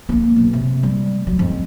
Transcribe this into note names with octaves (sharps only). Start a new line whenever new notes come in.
A#3 C4
B1
C3
G3
F#3
F2 G#3